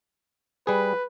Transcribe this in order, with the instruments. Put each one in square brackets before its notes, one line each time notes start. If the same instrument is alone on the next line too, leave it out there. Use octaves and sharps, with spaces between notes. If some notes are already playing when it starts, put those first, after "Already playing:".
[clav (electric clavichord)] G3 G#4 [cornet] B4